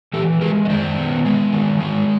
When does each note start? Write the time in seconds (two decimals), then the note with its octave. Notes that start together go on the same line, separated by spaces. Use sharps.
0.14 E3 G4 A4
0.41 G#3 G#4 A#4
0.65 D#5
0.70 D#3 C5 D5
0.98 B3
1.25 G#3
1.53 D#3
1.80 G#3